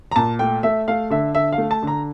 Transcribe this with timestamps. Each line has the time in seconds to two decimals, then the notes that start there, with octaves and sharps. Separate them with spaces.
0.11 A#5
0.16 A#2 A5
0.39 A3 G5
0.63 A3 E5
0.88 A3 F5
1.10 D3 E5
1.35 D3 E5
1.53 F5
1.58 A3
1.71 A5
1.83 D3 A#5